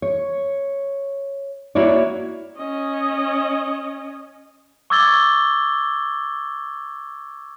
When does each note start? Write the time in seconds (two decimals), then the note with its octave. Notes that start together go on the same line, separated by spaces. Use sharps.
0.02 C#5
1.75 A#3 E4 F#4 C#5 D5
2.58 C#4 D#5
4.90 C#6 D6 E6 G#6 A6 G7